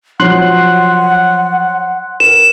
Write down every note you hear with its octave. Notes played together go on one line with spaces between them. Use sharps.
F3 F#3 C#5 F#5 C6 F#6
A#4 E7